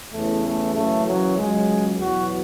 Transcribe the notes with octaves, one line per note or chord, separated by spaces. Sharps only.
E2 C#3 E3 A3
A3
F#2 C#3 E3 A3
F#3
C#2 C#3 F#3 G#3
E2 B2 F#3 F#4